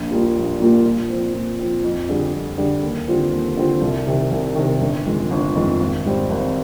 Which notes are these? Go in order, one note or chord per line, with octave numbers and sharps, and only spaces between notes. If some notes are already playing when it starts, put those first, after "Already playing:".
Already playing: A#1
A#2 G3 A#3 F4
A#1
A#2 G3 A#3 F4
A#2
F3 C4
A#2
F3 C4
F2
D3 G3 D4 G#4
F2
D3 G3 D4 G#4
D#2
D3 G3 C4 F4
D#2
D3 G3 C4 F4
C2
C3 D#3
C2
C3 D#3
G1
F2 D#3 G#3
G1
F2 D#3 G#3
G#1
G#2 G3 C4
G#1